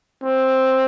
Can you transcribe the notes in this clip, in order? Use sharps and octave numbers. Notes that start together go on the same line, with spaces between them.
C4